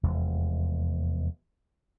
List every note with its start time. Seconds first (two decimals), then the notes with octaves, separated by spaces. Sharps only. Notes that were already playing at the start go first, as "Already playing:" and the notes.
0.03 F1 E2 G#3